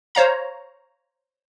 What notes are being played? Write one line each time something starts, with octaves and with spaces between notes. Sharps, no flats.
C5 C#5 F5 A#5